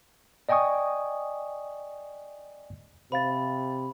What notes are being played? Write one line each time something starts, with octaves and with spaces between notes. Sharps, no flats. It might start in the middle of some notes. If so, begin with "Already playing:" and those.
D5 D#5 G5 G#5 C#6 D#6
C3 C5 F5 B5 A6